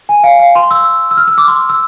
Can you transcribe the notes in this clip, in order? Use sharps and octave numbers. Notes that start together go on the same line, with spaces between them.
G#5
F5
F5
C6
E6
E6
F6
E6
D6
C6
E6